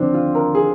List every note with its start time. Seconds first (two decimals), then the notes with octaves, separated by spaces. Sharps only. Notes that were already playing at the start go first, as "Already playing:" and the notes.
Already playing: D#2 D3 F3 C4 D4
0.14 F4
0.35 A#4
0.55 G#4